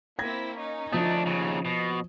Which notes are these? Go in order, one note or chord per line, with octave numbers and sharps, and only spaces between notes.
A#3 C4 E4 G#6 A#6
C#4 D#4
F3 A3 D4 D#6
D#2 C#3
B2